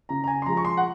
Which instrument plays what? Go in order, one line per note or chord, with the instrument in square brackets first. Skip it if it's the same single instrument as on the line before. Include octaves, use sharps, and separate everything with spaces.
[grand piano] C#3 A#5
A#5
G#5
C6
F3 G#3 A#5
C#6
C6
F#5